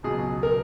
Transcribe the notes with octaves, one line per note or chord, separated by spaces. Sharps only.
C#2 B2 F#3 G#4
A#4